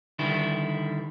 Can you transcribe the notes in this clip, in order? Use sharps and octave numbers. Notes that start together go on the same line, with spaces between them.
D3 D#3 G3 E4